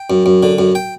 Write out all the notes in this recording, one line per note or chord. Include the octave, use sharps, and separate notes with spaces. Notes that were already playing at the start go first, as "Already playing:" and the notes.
Already playing: G5
F#2
F#2
D3
F#2
G5